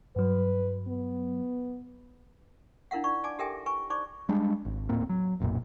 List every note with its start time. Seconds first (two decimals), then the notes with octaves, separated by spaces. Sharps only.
0.16 G2 F#3 B4
0.88 B3
2.91 D4 E4 A#4 F5 F#5
3.04 D#4 D5 C#6
3.24 D5 G#5 A5 D6
3.39 G4 A4 A#4 E5 G5 G#5
3.66 B4 G#5 C#6
3.90 D#4 C5 D5 C#6 D6
4.29 G3 G#3 D4
4.65 G#1
4.89 D#1 A2 A#3 C4
5.09 F#3
5.40 F#1 B1 F#2 A#2